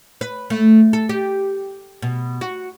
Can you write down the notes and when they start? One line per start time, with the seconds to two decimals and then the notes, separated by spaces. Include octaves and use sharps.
0.21 B4
0.50 A3
0.93 A4
1.09 G4
2.02 B2
2.41 F#4